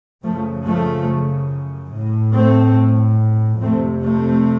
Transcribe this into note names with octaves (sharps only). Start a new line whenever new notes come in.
F#2 C#3 F3 A3
F3 A3
A2
A3 C4
F2 C3 A3 C4
A3 C4